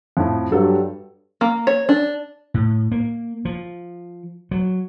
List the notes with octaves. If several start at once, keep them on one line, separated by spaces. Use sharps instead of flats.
F2 A2
G2 F#3 A4
A#3
C#5
D4
A2
A#3
F3
F#3